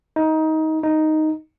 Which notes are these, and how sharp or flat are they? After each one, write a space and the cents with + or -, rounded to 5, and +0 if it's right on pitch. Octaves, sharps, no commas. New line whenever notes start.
D#4 +20
D#4 +0